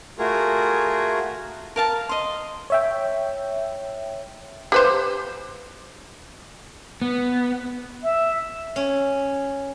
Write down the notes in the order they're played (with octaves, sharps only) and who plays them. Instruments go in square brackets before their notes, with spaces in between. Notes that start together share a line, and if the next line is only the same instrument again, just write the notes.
[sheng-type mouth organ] A3 F4 F#4 G#4 A#4
[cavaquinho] A#4 F5 A5
D#5 C6
[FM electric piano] C#5 E5 G5
[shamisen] G4 B4 C5
[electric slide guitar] B3
[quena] E5
[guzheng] C#4